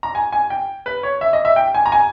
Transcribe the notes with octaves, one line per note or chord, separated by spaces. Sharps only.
A#5
G#5
G#5
G5
B4
C#5
E5
D#5
E5
G5
G#5
A#5
G#5